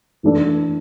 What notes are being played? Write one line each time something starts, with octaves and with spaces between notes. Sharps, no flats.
E3 A3 D4 A4